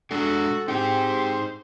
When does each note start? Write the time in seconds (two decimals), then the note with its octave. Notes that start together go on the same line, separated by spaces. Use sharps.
0.11 G#3 D4 F#4 G#4 A4
0.68 C4 D#4 G4 G#4 C5